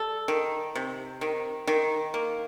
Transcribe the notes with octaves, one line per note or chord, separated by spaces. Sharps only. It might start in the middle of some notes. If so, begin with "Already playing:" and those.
Already playing: G3 A4
D#3
C3
D#3
D#3
A#3